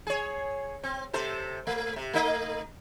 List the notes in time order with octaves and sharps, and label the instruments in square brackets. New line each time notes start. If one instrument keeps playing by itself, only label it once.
[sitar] G#4 C#5
C4
C3 A4 C5
A3
C3
A3 D#4 D#5